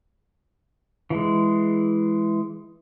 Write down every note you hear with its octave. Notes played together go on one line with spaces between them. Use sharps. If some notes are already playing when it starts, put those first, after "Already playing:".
E3 G#3